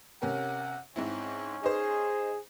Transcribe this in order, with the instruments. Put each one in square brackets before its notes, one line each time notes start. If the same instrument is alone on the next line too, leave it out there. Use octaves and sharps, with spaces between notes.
[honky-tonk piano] C3 C#4 A#4 [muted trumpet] F#5
[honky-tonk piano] G#2 C4 E4 [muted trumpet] C#4
[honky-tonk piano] D#4 C5 [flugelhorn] G#4